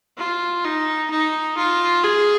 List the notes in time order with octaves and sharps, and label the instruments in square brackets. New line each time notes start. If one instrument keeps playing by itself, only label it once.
[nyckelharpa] F4
D#4
D#4
F4
G#4